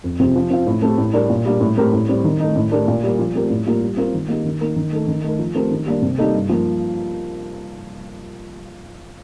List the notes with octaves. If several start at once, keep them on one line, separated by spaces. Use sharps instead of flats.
F2
C3 F3 C4 G4
F3
C4 F4
A2
A3 C4 G4
A2
G3 D4 G4 A#4
A#2
G3 A#3 D4
A2
A3 C4 G4 A#4
A2
G3 C4
D#3
A3 D#4
A2
A3 D4 G4 A#4
A#2
G3 A#3
F3
A3 C4 G4 A#4
A2
G3 A#3 F4
G3
C4 F4 A#4
D#3
A#3 D#4 G4
D#3
A#3 D#4 A#4
D#3
A3 D#4 A4
D#3
A3 D#4 A#4
F3
A3 C4 G4 A#4
D#3
G3 A#3 D4
C3
G3 A#3 D#4 A4
G2
F3 A#3